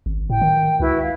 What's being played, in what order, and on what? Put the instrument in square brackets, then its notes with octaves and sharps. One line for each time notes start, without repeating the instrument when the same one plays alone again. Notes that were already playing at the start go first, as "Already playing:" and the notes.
[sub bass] G#1
[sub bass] A2 [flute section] G5
[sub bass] D#3
[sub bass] C#2 [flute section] E4 F#4 B4
[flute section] F5